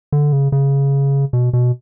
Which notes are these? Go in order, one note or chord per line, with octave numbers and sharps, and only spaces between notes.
D3
C#3
C#3
B2
B2